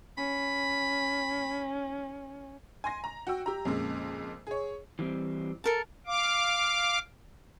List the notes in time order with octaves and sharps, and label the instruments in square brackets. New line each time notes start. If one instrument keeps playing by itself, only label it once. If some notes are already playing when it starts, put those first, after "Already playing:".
[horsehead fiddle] C#4 [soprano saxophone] B5
[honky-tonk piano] G#5 C6 A#6
A#5
F#4 G5 E6
G4 A#5
F2 A#2 C#3 G#3
G#4 C#5
[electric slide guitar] E3 G3 C4
[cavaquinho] A4 A#4 A5
[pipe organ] F5 D6